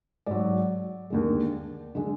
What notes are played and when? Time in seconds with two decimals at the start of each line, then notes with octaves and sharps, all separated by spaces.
0.26 G#2 F#3 D5
1.10 D#2 D3 G#3
1.95 D3 G#3